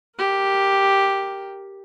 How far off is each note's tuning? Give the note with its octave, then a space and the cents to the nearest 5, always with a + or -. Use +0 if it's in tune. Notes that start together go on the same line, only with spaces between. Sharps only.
G4 +0 A#4 +0